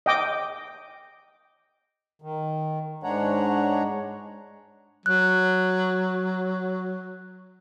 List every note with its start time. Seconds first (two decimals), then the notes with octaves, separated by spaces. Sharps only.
0.06 D#5 G5 D6
2.22 D#3
3.03 G#2 G#3 D4 C#5 F#5 A#5
5.06 F#3 F#6